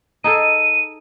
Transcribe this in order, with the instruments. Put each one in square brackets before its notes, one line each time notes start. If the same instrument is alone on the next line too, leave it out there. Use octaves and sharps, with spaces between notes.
[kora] D#4 G#4 A4 [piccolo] D#7